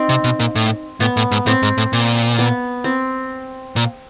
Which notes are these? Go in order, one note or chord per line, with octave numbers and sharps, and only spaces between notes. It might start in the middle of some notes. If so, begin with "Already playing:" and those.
Already playing: C4 D#4
C3
B2
A#2
A2
A2 B3
A2
G#2
A2 C4
G#2
A2
A#2
B3
C4
A#2